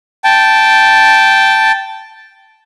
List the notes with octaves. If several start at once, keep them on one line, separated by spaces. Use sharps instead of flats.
G5 A5